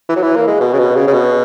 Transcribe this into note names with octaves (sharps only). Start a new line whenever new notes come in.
E3
F#3
E3
A#3
G#3
B2
C#3
B2
C#3
C#3
B2